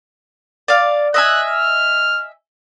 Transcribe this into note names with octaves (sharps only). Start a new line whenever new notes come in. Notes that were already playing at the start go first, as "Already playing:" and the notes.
D5 F5
D#5 E5 G#5 F#6
F6